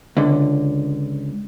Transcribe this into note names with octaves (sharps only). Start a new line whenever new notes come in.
C#2 D3